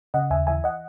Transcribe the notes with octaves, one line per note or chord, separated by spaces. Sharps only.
C#3 D#5 F#5
D#2 E5 G#5
E3 E5 G#5
D#5 F#5